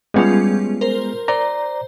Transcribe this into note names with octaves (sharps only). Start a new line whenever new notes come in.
G3 G#3 B3 C#4 F4 G#4
A#4 C5
C5 D5 A#5